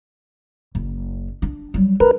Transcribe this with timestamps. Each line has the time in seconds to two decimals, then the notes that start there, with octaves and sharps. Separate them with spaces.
0.75 F#1
1.42 D4
1.74 F#3 G3
2.00 D4 A#4 B4